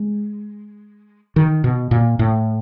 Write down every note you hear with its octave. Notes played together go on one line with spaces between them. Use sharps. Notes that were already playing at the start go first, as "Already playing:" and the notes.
Already playing: G#3
D#3
B2
A#2
A2